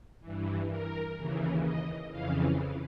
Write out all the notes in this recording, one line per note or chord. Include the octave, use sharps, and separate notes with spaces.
G2 E3
A#4
D#2 C#3 E3
D#5
F2 C#3 E3 F5